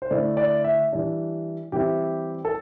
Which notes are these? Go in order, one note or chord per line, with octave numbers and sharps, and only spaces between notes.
C5
D3 A3 E4 D5
D5
E5
E3 G3 D4
E3 G3 C4 E4 G4
A4